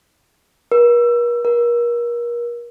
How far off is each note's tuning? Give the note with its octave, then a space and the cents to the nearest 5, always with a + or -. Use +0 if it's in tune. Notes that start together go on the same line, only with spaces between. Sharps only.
A#4 +45
A#4 +35